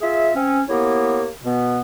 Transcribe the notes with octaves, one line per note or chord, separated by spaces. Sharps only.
F4 G#4 E5
C4 C#4
A#3 B3 E4 G4 C#5
B2 B3